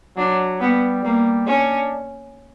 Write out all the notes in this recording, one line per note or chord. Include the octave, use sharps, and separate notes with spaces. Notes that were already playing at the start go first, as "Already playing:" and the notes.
F#3 D4
G3 B3
G3 A#3
C#4 D4